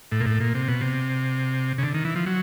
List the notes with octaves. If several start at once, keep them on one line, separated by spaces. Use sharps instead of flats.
A2
A#2
A2
A#2
C3
B2
C3
C#3
D3
D#3
E3
F3
F#3